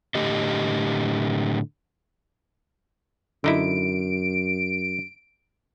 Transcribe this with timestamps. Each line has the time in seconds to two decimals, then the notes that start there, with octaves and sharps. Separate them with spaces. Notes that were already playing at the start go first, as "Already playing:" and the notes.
0.15 A2 D3 G4 D#5
3.44 F#2 D3 D#4 E4 D7